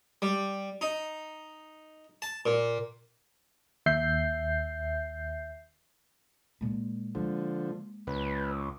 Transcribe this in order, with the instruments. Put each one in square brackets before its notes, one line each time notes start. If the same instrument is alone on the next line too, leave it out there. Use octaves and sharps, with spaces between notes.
[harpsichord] G3
D#4
A5
A#2
[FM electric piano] D#2 E5 G6 C7
[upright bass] A#2 G#3
[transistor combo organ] D3 F3 [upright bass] G#3 A#3
[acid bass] C#2 [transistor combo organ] B4